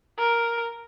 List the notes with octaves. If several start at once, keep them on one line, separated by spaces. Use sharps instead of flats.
A#4